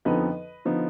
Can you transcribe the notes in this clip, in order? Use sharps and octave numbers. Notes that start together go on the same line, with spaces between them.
F2 D3 F3 B3 D#4 B4 D#5
D3 F3 B3 D#4